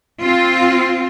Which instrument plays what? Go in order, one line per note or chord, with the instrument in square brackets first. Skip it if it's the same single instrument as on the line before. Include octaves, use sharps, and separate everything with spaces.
[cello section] C4 F4